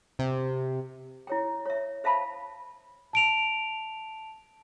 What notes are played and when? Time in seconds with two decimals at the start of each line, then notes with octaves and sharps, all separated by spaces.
0.19 C3
1.27 E4 C#5 G5
1.66 C#5 E5
2.04 C5 E5 F5 A5 B5
3.13 A5 D7 F7